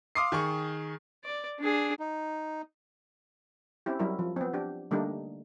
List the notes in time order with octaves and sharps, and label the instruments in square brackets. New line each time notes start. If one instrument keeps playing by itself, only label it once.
[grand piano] F5 C6 D6 D#6 C7
D#3 G#4 C#6
[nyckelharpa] D5
D4 G#4
[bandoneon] D#4
[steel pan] C4 C#4 E4 G4
F#3 G3 E4 A#4
F3
B3 C4
D4 G4
D3 G3 A3 A#3 D4 D#4